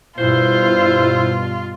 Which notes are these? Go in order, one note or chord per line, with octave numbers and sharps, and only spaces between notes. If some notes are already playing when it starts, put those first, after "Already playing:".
G2 B2 E4 F4 C5